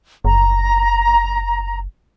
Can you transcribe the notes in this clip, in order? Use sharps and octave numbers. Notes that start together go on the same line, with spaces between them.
F#1 A#5